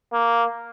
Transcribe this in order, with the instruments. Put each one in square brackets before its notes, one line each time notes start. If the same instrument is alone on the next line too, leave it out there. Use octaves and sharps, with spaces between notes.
[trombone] A#3